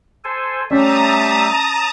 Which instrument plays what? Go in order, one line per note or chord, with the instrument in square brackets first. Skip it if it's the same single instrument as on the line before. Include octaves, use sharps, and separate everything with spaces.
[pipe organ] A4 C5 G#5
[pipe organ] G3 A3 E5 [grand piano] C#4 [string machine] A5 A#5 D#6